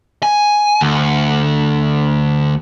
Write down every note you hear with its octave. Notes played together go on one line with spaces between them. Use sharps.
G#5
D2